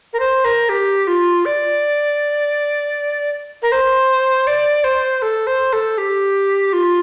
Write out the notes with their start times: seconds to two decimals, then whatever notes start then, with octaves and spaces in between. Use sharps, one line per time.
0.13 A#4
0.20 C5
0.45 A#4
0.69 G4
1.07 F4
1.45 D5
3.62 A#4
3.72 C5
4.47 D5
4.84 C5
5.22 A4
5.47 C5
5.73 A4
5.98 G4
6.73 F4